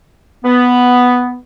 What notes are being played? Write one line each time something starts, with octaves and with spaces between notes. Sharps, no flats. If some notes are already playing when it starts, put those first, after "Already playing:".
B3